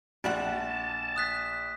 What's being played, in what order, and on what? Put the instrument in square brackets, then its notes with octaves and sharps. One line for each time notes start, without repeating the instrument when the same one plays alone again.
[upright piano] A#1 [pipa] G3 F#4 F#5 [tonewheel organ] A5
[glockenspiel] D#6 F#6 B6